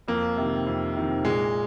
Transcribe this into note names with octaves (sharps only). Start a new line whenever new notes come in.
F2 A#3
C3 D#3
F2
C3 D#3
A#2 G#3